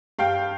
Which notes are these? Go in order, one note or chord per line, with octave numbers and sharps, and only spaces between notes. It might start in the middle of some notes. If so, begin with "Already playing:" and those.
G2 F5 G5